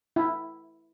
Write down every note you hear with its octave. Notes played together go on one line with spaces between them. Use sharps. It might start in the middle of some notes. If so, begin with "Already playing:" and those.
E4